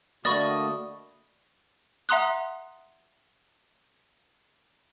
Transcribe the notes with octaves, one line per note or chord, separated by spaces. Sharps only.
D3 A3 A#3 F#4 D5 D#5 B5 C#6
E5 F#5 A#5 C6 D#6 F#6